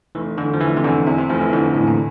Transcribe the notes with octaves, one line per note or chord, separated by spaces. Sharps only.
F1 E3
E2 D3
F3
F1 E3
C3
E2 D3
E2 C3
C3
F1 F3
E3
D3 E3
E2 A2
A#2